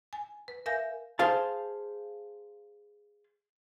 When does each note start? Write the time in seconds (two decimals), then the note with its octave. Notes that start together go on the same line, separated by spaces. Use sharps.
0.13 G#5
0.48 B4
0.66 A#4 E5 F5 G#5 G6 A#6
1.19 G#4 C5 F5 A5